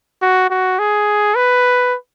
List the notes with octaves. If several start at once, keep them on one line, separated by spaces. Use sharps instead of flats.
F#4
F#4
G#4
B4